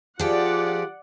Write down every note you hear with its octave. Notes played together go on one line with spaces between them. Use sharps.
F3 F4 G4 G#4 D5 F#5